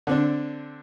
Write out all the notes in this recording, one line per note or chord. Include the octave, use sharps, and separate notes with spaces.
D3 C4 D4